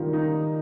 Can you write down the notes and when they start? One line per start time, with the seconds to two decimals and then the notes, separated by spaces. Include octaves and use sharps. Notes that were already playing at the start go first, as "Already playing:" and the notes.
Already playing: D#3 G3 F4
0.13 D#4